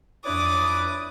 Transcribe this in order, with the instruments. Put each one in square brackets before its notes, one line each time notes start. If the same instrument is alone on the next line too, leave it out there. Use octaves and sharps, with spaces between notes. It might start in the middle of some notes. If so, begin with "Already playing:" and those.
[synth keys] F2 D4 C#5 [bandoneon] E4 B4 D5 [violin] D6 [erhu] D#6